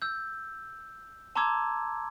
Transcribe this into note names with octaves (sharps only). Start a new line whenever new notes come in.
E6 G6
A5 A#5 C6 D6 E6 G#6